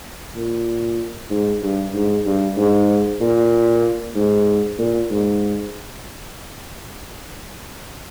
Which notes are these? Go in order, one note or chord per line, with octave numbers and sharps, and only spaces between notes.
A#2
G#2
G2
G#2
G2
G#2
A#2
G#2
A#2
G#2